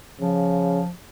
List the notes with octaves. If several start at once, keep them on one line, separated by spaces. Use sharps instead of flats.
C#3 F3